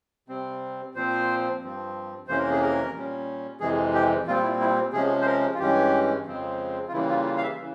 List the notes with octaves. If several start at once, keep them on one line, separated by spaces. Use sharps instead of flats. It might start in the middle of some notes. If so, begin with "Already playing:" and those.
C3 G3 C4
A#2 F3 C4 C5
G2 F3 C4
F2 C3 E3 A#3 C#4 C5
A#4
G#4
A#4
A#2 G3 C#4
F2 C3 E3 G#3 G#4
G4
A#2 G3 C4 F4
E4
E4
C3 F3 G#3 C#4 G#4
C5
A#4
F4
G2 E3 G#3 C#4 G4
F2 C#3 F3 G#3 C4
F4
C#3 E3 G3 A#3 E4
F4
F4
F5
E5
C#3 E3